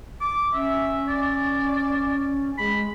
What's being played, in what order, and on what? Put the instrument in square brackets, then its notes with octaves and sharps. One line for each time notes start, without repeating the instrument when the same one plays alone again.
[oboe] D6
[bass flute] C#4 [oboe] E5
[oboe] D5
[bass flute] G#3 [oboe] B5